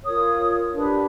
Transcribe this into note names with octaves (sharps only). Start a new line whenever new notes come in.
F4 A#4 C#5 D#6
D4 G4 B4